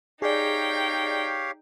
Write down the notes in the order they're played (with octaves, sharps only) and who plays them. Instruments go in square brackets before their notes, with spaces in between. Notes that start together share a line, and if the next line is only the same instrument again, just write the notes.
[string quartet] D#4 G5 [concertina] G4 C#5 F5 [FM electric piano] G#4 D5